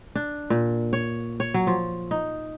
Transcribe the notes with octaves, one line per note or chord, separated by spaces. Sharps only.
D4
A#2
C#5
C#5
F#3
F3
D#4